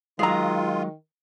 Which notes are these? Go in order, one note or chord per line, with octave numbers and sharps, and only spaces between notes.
D#3 F#3 G#3 F4 G#4 A#5